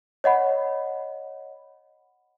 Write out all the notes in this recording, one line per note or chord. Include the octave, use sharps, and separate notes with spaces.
C#5 D#5 F#5 B5